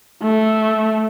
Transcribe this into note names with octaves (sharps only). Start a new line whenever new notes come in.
A3